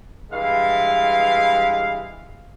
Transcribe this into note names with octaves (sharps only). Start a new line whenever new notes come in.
G2 E3 G#3 F5